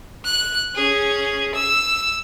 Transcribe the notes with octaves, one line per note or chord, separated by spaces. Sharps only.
F#6
C#4 G#4
E6